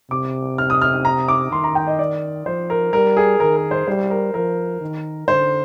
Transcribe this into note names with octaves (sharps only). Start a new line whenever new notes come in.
C3 D6
F6
D#6
F6
A#5
D6
D#3 C6
A#5
G5
D#5
D5
F3 C5
A#4
G3 A#4
G#4
D#3 A#4
A#4
C5
G3 C5
A#4
F3 A#4
D#3
D3 C5